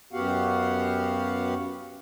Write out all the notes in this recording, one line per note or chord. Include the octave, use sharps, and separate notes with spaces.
F#2 B3 F#4 G4 F5 F#5